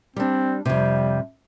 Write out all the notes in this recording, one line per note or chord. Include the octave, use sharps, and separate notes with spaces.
G3 C4 D4
F2 C3 G3